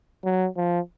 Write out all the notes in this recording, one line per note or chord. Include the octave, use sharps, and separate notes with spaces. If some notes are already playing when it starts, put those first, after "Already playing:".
F#3
F3